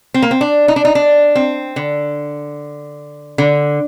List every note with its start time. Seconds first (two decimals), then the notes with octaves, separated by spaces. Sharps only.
0.14 C4
0.23 A#3
0.31 C4
0.41 D4
0.68 D#4
0.76 D4
0.85 D#4
0.95 D4
1.35 C4
1.76 D3
3.38 D3